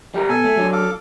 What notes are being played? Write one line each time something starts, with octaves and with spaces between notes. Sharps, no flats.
G3 G4 A#4
B2 A4 G#5
A3
F#3 D4
A4 F5 D6